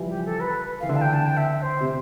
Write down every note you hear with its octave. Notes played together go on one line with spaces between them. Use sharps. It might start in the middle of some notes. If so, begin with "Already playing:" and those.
Already playing: E3 F3 G3
G4
A4
B4
E3 F5
D3 E5
A5
G5
A5
G5
E5
C5
C3